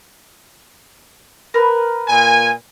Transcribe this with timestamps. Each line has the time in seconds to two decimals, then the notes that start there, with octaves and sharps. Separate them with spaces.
1.54 A#4 B4
2.08 A#2 G#5